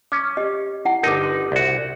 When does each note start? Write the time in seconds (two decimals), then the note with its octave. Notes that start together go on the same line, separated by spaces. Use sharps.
0.12 C#4 D6
0.37 G4 D#5
0.85 E4 F#5
1.03 G1 D#4 A#4 D6
1.23 C6
1.52 C2 F#4